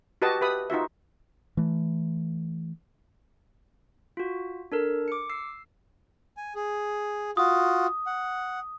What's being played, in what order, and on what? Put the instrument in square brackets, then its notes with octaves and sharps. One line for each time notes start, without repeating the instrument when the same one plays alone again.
[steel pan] F#4 G4 B4 D#5 A5
G4 B4 E5 B5 D#6
D#4 F4 F#4 E5
[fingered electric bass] E3 A3
[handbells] F4 F#4
D4 A4 A#4
D6 C#7
E6 C7
[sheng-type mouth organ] G#5
G#4
[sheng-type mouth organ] F4 F#4 [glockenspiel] D#6
[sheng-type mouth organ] F#5